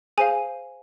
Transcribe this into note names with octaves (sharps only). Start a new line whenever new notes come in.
G#4 C5 F5 G#5